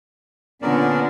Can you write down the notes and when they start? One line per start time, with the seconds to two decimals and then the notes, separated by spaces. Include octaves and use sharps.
0.62 A#2 D3 B3 C#4 A#4 D5